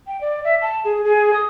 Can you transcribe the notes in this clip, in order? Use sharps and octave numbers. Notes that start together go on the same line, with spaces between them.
G5
D5
E5
A5
G#4
G#4
D#6